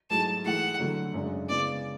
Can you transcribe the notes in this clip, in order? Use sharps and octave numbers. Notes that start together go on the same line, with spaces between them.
G#2 F#3 A3 E4 G#4 A5
E3 A3 E4 G#4 F#5
D3 F#3 A3 E4
F#2 C#3 G#3 D4
C#3 G#3 B3 E4 D5